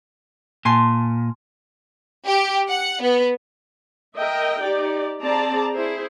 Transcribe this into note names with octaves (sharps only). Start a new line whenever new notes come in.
A#2 G#5 A5 C6
G4
F#5
B3
A#4 D#5 E5 G5
D#4 G4 D5
C4 G#4 D5 A5 A#5
E4 G#4 C5